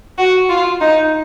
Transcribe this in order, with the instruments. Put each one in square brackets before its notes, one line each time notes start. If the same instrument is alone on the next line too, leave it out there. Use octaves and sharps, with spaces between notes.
[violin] F#4
F4
D#4